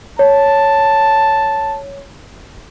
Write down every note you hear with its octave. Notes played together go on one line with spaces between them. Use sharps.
C#5 A5